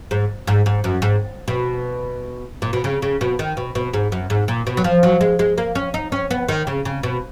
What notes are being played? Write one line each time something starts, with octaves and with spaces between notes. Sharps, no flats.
G#2
G#2
G#2
F#2
G#2
B2
A#2
B2
C#3
C#3
B2
D#3
B2
B2
G#2
F#2
G#2
A#2
B2
F#3
F3
F#3
G#3
G#3
A#3
C#4
D#4
C#4
B3
D#3
C#3
C#3
B2